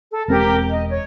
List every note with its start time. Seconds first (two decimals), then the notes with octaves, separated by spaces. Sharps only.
0.12 A4
0.28 E1 C4 G4 A#4
0.70 D#5
0.89 C#5